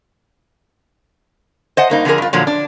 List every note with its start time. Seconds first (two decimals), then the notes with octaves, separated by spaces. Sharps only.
1.77 C5 D#5 F#5 A5
1.90 G2 A#3 D#4
2.05 D3 F3 D4 E4 G#4 A#4
2.18 G2 F4
2.33 A#2 D3 F3 F#3
2.47 D4